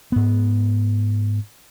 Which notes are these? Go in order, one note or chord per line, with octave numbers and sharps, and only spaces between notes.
G#2 B3